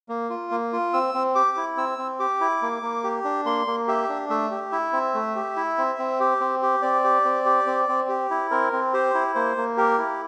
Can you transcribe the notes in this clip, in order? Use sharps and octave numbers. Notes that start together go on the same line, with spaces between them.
A#3
F4
A#3
F4
C4 E6
C4
G4 D6
E4
C4 E6
C4
G4 D6
E4
A#3
A#3
G4
D4
A#3 C6
A#3
G4 E5
D4
A3 E5
G4
E4 E5
C4
A3
G4
E4
C4
C4
G4
C4
G4
C4 D5
G4
C4
G4
C4
C4
G4
E4
C4 A#4
C4
G4 C5
E4
A#3 C5
A#3
G4 A#4
E4